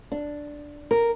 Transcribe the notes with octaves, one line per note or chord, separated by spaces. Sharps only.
D4
A#4